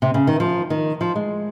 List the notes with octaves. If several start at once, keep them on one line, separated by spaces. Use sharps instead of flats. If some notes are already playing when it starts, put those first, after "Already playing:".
C3
C#3
D#3
F3
D#3
F3
G#3